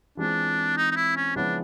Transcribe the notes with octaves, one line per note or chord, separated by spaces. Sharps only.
E3 G#3 C4 D4 F4
D#4
D#4
E4
C#4
C#3 F3 G#3 B3 D4 E4